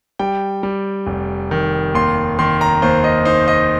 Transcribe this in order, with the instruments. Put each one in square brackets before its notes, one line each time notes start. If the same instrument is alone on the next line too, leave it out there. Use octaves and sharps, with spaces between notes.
[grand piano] G3 G5
G3
F1
D#3
D#2 C6
D#3 C6
A#5
D#2 C5
D#5
D#4 C5
D#5